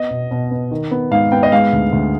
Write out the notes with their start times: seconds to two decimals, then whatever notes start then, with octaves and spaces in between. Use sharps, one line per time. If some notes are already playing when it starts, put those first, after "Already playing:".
Already playing: B3 D#5
0.11 B2
0.31 B2
0.51 B3
0.71 D#3
0.91 B3
1.11 G#2 F5
1.32 B3 G5
1.43 D#5
1.52 G#3 F5
1.73 D2
1.92 D2